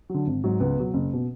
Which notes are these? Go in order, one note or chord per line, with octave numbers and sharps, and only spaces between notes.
D3 F#3
G#1
G#2 F#3
C#2 B3
B2 F#3
F#1
B2